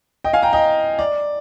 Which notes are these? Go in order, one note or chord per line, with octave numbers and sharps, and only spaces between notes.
D#5 G5
F5 G#5
G5 A#5
D#5 G5
D5